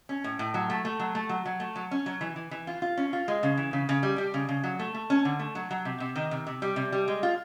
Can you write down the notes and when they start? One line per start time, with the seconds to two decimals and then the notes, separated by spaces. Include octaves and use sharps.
0.09 C#4
0.24 A2
0.39 A2
0.54 F#3
0.70 A3
0.85 A3
1.00 F#3
1.15 A3
1.29 F#3
1.45 F#3
1.60 A3
1.76 F#3
1.91 C#4
2.06 F#3
2.21 E3
2.36 E3
2.51 E3
2.67 F4
2.82 F4
2.97 C#4
3.13 F4
3.28 G#3
3.43 C#3
3.57 E3
3.73 C#3
3.89 C#3
4.03 G3
4.18 G3
4.34 C#3
4.49 C#3
4.64 F#3
4.79 A3
4.95 A3
5.10 C#4
5.25 D3
5.39 A3
5.55 F#3
5.71 F#3
5.85 C3
6.00 C3
6.16 D#3
6.31 C3
6.47 C3
6.62 G3
6.76 C3
6.92 G3
7.08 G#3
7.23 F4